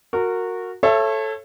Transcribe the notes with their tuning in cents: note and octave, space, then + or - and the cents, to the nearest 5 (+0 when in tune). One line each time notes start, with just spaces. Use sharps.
F#4 -15 A#4 -20
A4 -5 C#5 -25 E5 +30